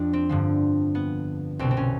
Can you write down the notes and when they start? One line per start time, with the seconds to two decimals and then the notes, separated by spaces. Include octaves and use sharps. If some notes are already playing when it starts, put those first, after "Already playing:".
Already playing: F2 F3 D4
0.13 C4
0.29 G2 D3 F3
0.95 B3
1.59 C2 B2 C4
1.71 C4
1.77 C#4